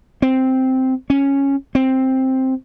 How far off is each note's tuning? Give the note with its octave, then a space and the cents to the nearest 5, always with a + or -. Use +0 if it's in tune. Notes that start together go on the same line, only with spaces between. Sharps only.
C4 -5
C#4 -5
C4 +5